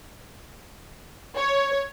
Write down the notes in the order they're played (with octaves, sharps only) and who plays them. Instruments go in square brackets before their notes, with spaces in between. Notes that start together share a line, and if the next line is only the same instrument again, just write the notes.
[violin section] C#5